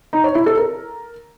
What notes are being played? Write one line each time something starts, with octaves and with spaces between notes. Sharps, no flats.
D#4
C#5
E4
A4
A#4